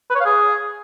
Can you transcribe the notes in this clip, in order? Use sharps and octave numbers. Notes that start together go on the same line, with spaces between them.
B4
C#5
F5
G#4